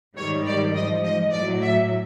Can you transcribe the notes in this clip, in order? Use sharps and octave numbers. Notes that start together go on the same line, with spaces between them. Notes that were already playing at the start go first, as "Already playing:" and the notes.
G#2 D#3 G3 C#5
D5
G#2 F3 D#5
D#5
A2 F#3 D5
E5